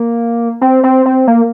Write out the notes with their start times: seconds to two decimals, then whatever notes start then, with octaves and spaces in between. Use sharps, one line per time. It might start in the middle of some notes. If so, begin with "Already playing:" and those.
Already playing: A#3
0.61 C4
0.84 C4
1.06 C4
1.27 A#3